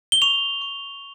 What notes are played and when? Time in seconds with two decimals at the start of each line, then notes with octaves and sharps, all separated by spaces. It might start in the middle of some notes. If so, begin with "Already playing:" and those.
0.12 G7
0.22 C#6 F7
0.61 C#6